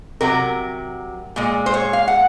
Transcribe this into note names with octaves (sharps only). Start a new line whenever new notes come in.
C3 F#3 A#4
A#2 G#3
C5
C#5
F5
F#5